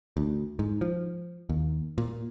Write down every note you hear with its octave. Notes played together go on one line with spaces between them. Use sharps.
D2
G#2
F3
D#2
A#2